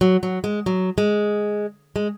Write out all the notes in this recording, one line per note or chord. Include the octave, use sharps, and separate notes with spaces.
F#3
F#3
G#3
F#3
G#3
G#3